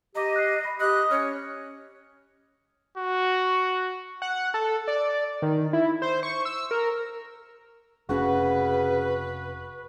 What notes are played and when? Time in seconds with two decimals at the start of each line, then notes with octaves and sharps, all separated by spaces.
0.15 G4 D#5 A#5 D6
0.36 F#6 C7
0.65 B5
0.80 G4 D#5 F#6
1.11 C#4 C#5 F6
2.97 F#4
4.22 F#5
4.54 A4
4.88 D5
5.42 D#3
5.73 E4
6.02 C5
6.23 C#6
6.45 E6
6.71 A#4
8.09 F1 C#3 C#4 F#4 B4